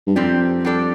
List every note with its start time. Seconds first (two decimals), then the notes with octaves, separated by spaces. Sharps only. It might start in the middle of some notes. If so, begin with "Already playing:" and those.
0.07 G2
0.16 F2 C3 G3 C4 G4 D5
0.65 G3 D4 A4 D5